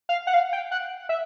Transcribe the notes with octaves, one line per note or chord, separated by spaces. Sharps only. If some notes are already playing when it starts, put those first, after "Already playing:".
F5
F#5
F5
G5
F#5
E5